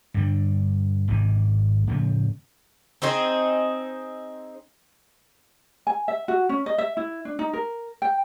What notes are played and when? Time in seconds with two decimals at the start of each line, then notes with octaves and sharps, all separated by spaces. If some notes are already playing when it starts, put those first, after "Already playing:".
0.14 G2 D3 G3
1.08 G#1 G#2 C3 E3
1.87 A2 C#3 F3 A3
3.02 C4 D#4 G#4 C5
5.87 G#5
6.08 E5
6.28 F#4
6.49 C#4
6.66 D#5
6.78 E5
6.97 E4
7.25 D4
7.39 D#4
7.53 A#4
8.02 G5